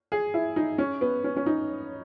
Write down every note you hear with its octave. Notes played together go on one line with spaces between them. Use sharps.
G#4
E4
D#4
C#4
B3
C#4
C#4
D#4